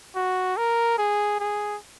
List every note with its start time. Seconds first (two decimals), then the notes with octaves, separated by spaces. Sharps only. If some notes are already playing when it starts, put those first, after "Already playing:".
0.16 F#4
0.57 A#4
0.98 G#4
1.40 G#4